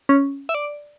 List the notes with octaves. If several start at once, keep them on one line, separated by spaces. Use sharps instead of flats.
C#4
E5
D5